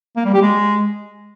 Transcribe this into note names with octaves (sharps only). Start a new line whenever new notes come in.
A#3
G3
G4
G#3